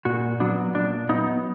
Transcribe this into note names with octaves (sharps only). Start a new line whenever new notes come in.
A#2 F#4
F#3 B3 D4
A#2 D4
F#3 B3 D#4